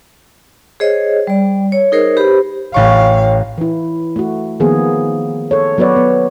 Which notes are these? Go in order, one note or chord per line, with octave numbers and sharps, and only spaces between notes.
G#4 C5 C#5 D#5
G3 D5
C#5
D#4 G#4 A#4 C5 C#5 D#5
G4 B4 C5 B5
A1 C#5 F5 G5 C#6
E3 E4
A3 F#4
D#3 F3 A#3 B3 G#4
A4 C#5
F#3 B3 F#4 B4 C#5 D5
B3